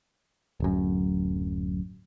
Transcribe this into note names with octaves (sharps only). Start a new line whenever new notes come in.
D1 F#2